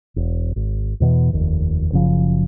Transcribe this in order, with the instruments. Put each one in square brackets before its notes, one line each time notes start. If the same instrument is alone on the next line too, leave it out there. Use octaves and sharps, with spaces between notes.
[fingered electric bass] E1
G#1
E2 B2 D3 E3
F1 D#2
F#1 C#3 F3